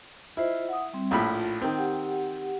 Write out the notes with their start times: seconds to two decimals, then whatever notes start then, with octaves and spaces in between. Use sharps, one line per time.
0.37 E4 F4 C5 D#5
0.69 F#5 D#6
0.93 G3 C4
1.11 A#1 A2 F4 B5
1.62 D#3 C4
1.78 G4 F#5